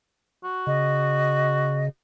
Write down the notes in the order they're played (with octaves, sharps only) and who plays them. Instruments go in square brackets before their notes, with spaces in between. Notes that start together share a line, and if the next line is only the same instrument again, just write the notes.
[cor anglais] F#4
[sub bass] C#3 [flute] D#5